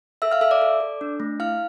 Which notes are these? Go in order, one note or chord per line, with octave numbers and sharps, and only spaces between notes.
A4 E5 E6
F5 F6
A4 E5 E6
D5 D6
A4
A4
D4
A3
E4 F5 F6